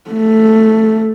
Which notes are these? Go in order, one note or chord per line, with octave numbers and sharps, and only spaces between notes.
A3